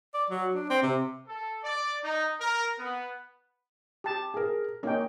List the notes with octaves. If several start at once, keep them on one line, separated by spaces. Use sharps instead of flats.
D5
F#3
D4
C4
C3
A4
D5
D#4
A#4
B3
G4 A5
G#4 A#4
A#3 C#4 D#4 G5